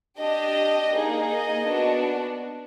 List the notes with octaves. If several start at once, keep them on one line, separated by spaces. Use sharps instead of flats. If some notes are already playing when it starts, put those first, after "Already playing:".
D4 G4 D#5
A#3 D#4 G#4
D#5
B3 D4 F#4